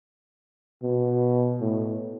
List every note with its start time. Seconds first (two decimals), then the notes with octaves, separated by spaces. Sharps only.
0.83 B2
1.60 A2